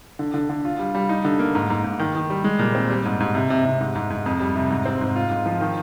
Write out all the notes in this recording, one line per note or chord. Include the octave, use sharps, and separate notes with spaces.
D3
D3
D3
F4
G3
G3
D#4
D3
A#3
G#2
G#2
G#2
D#3
D#3
G3
G#3
A#2
C4
G3
G#2
G#2
C3
C3
C3
G#2
G#2
G#2
F2
G3
C3
G#2
C4
G#2
F4
G#2
F3
D#3